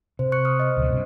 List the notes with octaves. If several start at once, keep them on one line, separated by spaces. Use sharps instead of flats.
C3 C5
C#6 F#6 C#7
D#6 F6
C5 D#5
C#2 B2 F3
G2 C3